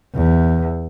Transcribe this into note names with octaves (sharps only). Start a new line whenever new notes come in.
E2